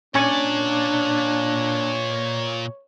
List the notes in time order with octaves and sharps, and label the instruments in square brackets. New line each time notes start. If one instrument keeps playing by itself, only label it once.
[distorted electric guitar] A#2 D5 [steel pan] C#4 G#5 C#6 [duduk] D4 [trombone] C#5